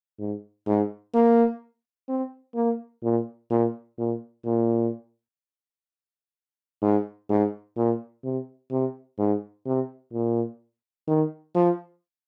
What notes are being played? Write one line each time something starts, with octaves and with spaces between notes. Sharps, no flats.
G#2
G#2
A#3
C4
A#3
A#2
A#2
A#2
A#2
G#2
G#2
A#2
C3
C3
G#2
C3
A#2
D#3
F3